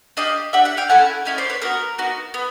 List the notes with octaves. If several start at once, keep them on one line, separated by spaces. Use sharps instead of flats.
D4 G4 D#5 F5
D4 G4 E5 F#5
E5 F#5
F5 G5
A3 C#4 E4 A4 F#5 G#5
A3 C#4 E4 C#5 D#5
C5 D5
B4 C#5
B3 D#4 F#4 A#4
B3 D#4 F#4
B3